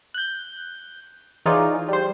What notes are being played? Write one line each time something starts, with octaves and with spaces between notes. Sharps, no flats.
F#6 G6
E3 D#4 F4 G#4 C#5 D5
G3 C5